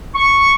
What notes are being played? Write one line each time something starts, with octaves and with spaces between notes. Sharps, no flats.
C#6